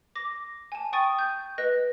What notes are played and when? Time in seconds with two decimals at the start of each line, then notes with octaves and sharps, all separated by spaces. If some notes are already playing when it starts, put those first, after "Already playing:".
0.15 D6 A#6
0.72 G#5 A5
0.93 G5 C#6 D#6 A6 D#7
1.19 G6
1.58 B4 D#5 F#6 A#6